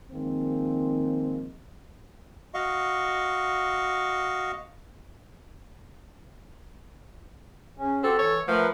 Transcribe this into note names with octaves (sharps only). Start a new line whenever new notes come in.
D#3 F3 G#3 A#3 C4
F#4 D#5 F5 C#6
C#3 C#4
C4 F#4 G4 A4
E3 C#5
F3 A3 A#4 B4 F#5